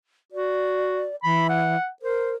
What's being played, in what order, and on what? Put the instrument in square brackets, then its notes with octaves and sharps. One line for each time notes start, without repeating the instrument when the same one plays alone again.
[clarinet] F#4 [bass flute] D5
[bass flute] E3 [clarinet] B5
[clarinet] F#5
[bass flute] A#4 [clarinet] C5